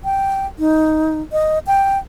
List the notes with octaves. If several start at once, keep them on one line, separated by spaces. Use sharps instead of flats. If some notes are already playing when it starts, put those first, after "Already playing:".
G5
D#4
D#5
G5